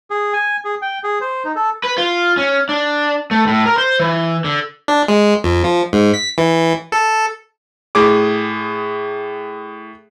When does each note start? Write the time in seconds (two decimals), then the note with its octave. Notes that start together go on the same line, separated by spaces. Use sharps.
0.11 G#4
0.33 G#5
0.65 G#4
0.82 G5
1.04 G#4
1.21 C5
1.45 D#4
1.56 A4
1.84 B4
1.98 F4
2.37 C#4
2.69 D4
3.31 A3
3.47 A2
3.66 A#4
3.78 C5
3.99 E3
4.44 D3
4.88 D4
5.08 G#3
5.44 F2
5.64 F3
5.93 G#2
6.14 B6
6.38 E3
6.92 A4
7.95 A2 G#4 D6